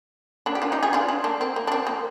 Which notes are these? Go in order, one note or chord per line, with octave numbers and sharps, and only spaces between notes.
A#3 D4
G4
D4 F4
D#4 G4
F4 G#4
D4 F4
D4 F4
A#3 D4
C4
A#3
D4
C4
A#3